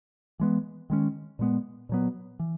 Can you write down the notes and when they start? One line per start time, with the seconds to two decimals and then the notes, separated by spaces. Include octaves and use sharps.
0.40 E3 G#3 B3
0.90 D#3 G#3 C#4
1.39 A#2 G#3 B3
1.89 A#2 F#3 B3
2.40 E3